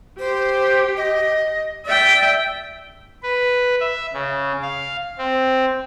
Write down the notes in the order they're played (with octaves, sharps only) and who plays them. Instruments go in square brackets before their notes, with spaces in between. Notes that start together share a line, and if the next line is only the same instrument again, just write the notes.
[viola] G4 [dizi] C5
[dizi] D#5
[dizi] D5 [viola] E5 G5
[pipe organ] B4
E5
C#3
F5
C4